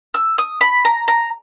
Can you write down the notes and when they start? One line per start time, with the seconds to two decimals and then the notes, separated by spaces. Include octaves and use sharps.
0.14 E6
0.38 D#6
0.61 B5
0.85 A#5
1.08 A#5